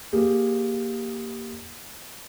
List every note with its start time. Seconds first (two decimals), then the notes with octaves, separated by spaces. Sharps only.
0.13 A#3 G4 G#4